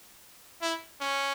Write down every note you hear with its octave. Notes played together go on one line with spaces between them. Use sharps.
E4
C#4